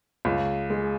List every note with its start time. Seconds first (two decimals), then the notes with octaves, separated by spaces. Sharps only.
0.25 C#2
0.70 G#3